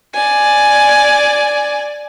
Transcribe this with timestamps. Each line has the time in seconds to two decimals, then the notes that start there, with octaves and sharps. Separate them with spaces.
0.15 D5 G#5